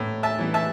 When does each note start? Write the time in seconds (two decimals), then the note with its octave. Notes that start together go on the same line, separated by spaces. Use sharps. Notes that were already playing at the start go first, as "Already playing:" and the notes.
Already playing: A2 B3
0.23 E5 A5
0.39 E3 B3 E4
0.54 E5 A5